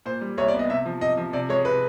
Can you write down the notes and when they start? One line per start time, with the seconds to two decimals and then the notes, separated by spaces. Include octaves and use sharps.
0.06 A#2 C5
0.21 G3
0.38 C2 C#5
0.48 D5
0.54 B3
0.59 D#5
0.69 C3 E5
0.85 F3
1.01 C3 D#5
1.17 F3
1.33 C3 D5
1.49 G#3 C#5
1.65 C3 B4